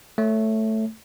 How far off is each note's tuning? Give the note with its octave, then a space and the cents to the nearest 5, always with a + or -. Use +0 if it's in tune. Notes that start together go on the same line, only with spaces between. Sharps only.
A3 +0 C#5 +0